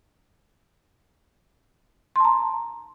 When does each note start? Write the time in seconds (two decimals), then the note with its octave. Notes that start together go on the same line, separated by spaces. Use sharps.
2.16 C6
2.20 A5
2.25 A#5